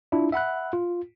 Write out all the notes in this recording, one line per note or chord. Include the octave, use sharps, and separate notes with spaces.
D4 E4 F4
E5 F#5 B5 F#6
F4